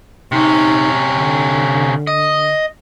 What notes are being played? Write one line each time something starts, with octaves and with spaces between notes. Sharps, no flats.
C3 C#4 D#4
D3
D#5